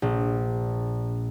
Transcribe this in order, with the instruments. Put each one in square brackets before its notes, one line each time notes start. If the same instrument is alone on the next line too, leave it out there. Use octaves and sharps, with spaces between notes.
[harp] A#1